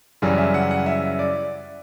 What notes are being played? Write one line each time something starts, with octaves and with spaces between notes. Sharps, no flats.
F#2 C#3 E3 G3
E5
F#5
F#5
E5
D5